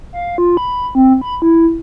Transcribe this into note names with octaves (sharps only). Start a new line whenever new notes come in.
F5
F4
B5
C4
B5
E4